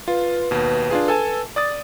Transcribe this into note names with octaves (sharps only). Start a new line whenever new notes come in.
F4 B4
D#2 B2
D4 F4 G#4
A4 G#5 A5
D5 D#6 A6